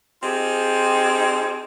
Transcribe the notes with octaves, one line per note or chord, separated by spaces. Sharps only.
C4 D#4 F4 G4 G#4